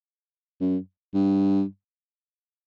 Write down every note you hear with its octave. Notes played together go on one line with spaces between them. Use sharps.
F#2
G2